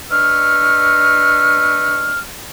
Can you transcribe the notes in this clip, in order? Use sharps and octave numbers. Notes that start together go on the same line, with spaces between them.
D4 B4 D#5 C#6 E6 F6